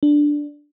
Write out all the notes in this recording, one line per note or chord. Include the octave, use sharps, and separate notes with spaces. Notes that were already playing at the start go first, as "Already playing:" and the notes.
D4